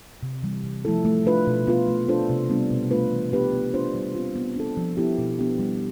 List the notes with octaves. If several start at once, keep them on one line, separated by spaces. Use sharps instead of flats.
C3
E3 G3
C3
F3 A3 E4 A4
A3
D4 F4 B4
B2
B3 F4 B4
A3
D4 F4 A4 C5
C3
G3 B3 D4
B2
A3 D4 F4 B4
E3
B3 D4 G4 B4
B3
D4 F4 C5
G3
C4 F4
B3
D4 A4
F3
B3 E4 G4
B2
B3 D4 G4
G3